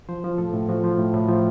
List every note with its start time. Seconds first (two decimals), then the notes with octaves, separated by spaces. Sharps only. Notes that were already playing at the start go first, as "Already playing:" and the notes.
0.09 F3 C5
0.24 F3
0.38 A2 A4
0.54 A2
0.69 F3 F#4
0.84 F3
0.98 A2
1.14 A2
1.29 F3